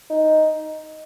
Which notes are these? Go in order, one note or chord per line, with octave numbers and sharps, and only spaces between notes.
D#4